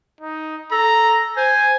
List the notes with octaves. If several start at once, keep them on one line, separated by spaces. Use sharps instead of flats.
D#4
A4 A#5
C5 G#5